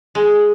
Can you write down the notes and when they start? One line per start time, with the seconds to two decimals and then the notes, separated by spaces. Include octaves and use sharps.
0.15 G#3